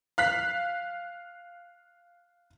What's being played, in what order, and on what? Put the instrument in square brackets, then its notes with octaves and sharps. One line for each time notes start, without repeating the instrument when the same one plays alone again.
[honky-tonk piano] F5 F#6 B6